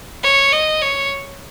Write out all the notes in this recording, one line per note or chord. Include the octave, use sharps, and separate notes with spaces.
C#5
D#5
C#5